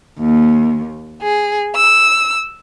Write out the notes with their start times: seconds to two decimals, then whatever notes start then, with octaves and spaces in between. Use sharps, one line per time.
0.19 D#2
1.23 G#4
1.77 E6